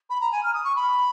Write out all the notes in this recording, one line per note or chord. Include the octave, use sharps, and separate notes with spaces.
B5
A#5
G#5
F6
D#6
C#6
B5